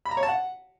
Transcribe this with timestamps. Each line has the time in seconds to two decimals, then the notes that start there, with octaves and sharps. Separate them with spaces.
0.06 B5
0.11 A#5
0.17 C#5
0.23 A5
0.29 F#5